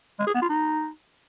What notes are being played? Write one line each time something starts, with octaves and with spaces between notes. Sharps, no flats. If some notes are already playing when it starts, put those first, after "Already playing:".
G#3
G#4
B3
F4
D#4